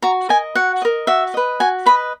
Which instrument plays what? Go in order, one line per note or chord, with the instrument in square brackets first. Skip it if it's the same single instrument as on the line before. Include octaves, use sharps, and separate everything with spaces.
[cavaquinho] F#4 A#5
A#4 D#5 G#5
F#4 F#5
A#4 D#5
F#4 E5
B4 D#5
F#4 G#5
B4 D#5 B5